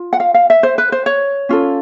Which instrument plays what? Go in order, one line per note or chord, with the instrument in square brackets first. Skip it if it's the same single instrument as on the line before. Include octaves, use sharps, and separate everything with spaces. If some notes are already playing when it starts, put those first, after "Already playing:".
Already playing: [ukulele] F4
F#5
F5
F5
E5
C5
B4
C5
C#5
C#4 F4 A4